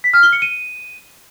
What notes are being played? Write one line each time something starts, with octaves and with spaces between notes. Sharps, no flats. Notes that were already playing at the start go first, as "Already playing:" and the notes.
B6
F6
G7
C#7
D#7